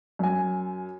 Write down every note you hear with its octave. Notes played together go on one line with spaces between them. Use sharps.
F#2 G#5